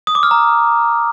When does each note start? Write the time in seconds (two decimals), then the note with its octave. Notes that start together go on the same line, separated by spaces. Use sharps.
0.07 D#6
0.15 D6
0.23 F6
0.31 A#5